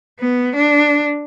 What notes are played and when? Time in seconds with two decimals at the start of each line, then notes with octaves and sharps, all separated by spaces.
0.20 B3
0.56 D4